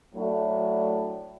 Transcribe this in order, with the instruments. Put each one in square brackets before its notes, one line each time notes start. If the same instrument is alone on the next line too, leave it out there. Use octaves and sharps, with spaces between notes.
[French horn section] A2 F#3 A3 D4